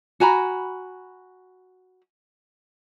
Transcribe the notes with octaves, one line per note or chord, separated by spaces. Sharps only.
F#4 G#5 A#5 B5